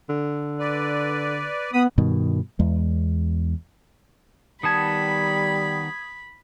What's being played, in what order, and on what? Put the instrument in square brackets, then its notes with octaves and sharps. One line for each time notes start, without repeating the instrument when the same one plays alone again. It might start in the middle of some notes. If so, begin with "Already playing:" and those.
[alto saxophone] D3
[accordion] B4 D5
[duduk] B3 [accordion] B5 D#6
[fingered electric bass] G2 B2 D#3
E2 G#3
[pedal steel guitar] D#3 B3 A5 [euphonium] G3 [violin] B5 [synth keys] D#6 G#6